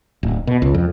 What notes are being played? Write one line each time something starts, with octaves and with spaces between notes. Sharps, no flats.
D1
B2
C#2
F2